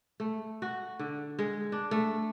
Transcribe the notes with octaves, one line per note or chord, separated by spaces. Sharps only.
A3
F#4
D3
G#3
D4
A3